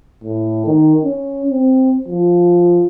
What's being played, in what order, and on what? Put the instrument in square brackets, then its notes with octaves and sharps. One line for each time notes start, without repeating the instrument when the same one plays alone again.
[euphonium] A2
D#3
C#4
C4
F3